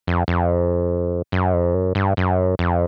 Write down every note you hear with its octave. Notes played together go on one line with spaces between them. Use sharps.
F2
F2
F#2
F2
F#2
G2
F#2
F2